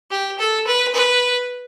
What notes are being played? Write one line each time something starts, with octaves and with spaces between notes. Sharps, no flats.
G4
A4
B4
B4